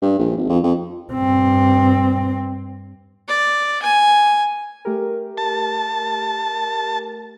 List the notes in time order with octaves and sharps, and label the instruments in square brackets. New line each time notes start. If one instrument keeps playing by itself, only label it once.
[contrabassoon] G2
A#1
G#1
F2
F2
[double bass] G2 C4
[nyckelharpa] D5
G#5
[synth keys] A3 G4 A#4
[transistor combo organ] A5